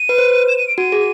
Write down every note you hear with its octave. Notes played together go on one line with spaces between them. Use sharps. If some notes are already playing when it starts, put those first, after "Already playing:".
Already playing: D#7
B4
C5
E7
D#7
D7
F#4 D#7
G#4